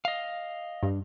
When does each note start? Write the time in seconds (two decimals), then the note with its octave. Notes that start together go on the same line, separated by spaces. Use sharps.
0.05 D#5 F5
0.83 G2